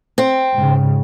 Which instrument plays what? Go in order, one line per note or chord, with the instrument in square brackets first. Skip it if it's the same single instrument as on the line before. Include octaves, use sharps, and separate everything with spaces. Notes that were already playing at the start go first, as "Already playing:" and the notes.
[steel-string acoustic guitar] C4
[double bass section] G#2 C#3